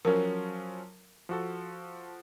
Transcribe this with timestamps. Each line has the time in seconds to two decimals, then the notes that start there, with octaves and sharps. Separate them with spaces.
0.05 F3 F#3 C#4 A#4
1.29 F3 F#4 A4